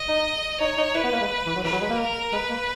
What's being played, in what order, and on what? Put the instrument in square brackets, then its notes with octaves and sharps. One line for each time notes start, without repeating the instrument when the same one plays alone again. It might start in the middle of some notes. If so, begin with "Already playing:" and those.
Already playing: [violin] D#5
[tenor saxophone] D#4
[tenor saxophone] D#4 [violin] C#5
[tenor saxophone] D#4
[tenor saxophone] E4 [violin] B4
[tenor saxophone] B3
A#3
G#3
E3
F#3
[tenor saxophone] E3 [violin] B4
[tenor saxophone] F#3
G#3
A#3
[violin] A#4
[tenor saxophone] G#3 [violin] B4
[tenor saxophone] A#3